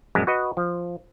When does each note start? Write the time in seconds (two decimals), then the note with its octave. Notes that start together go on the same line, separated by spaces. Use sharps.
0.15 A#1 F#2 G#3
0.27 F#4 B4 D#5
0.57 F3